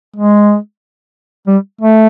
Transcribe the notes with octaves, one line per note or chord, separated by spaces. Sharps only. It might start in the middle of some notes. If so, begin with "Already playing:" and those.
G#3
G3
A3